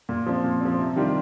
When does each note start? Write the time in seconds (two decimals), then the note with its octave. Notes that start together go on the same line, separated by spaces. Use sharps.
0.09 A#2
0.26 F3 C4
0.44 A#2
0.61 F3 C4
0.79 C3
0.96 D#3 G3 D4 F4